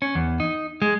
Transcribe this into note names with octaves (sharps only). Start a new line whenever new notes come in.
C#4
E2
D#4
G#3